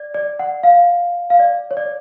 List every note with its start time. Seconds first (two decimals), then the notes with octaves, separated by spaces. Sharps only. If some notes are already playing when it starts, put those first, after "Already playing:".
Already playing: D5
0.14 D5
0.39 F#5
0.63 F5
1.30 F5
1.40 D5
1.71 C#5
1.77 D5